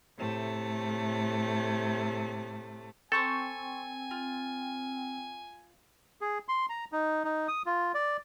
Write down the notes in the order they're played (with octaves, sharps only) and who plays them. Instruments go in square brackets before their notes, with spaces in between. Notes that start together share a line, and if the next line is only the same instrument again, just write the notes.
[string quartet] A2 C3 A3
[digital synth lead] C4 [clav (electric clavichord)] A4 [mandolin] C5 C#6 G6 [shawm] G#5
[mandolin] F4
[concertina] G#4
C6
A#5
D#4
D#4
D#6
F4
D5